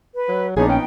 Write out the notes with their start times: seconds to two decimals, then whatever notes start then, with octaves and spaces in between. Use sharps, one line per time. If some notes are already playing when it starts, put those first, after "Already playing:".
0.14 B4
0.28 F#3
0.57 A#1 F3 B3 D4 D#4 G#4 C#5
0.68 C#4 G5